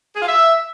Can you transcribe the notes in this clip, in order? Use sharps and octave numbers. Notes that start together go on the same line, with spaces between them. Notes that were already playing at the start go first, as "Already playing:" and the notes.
G#4
F4
E5